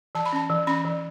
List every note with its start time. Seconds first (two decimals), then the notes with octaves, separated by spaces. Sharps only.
0.15 E3 A5
0.26 B5
0.33 C#4 A5
0.50 E3
0.67 C#4 B5
0.85 E3